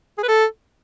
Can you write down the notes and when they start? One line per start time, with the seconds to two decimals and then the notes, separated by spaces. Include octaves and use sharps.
0.18 G#4
0.23 B4
0.28 A4